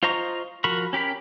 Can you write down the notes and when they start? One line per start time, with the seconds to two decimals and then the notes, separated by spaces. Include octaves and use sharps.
0.03 F4 C5 D#5 A#5 C#6
0.64 F3 F#4 A#4 B5 C#6
0.93 C#4 G4 A#4 B5